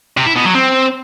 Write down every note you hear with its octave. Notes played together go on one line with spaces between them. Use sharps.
C3
E4
B2
F#3
C4